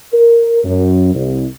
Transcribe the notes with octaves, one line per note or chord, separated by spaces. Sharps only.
A#4
F#2
C2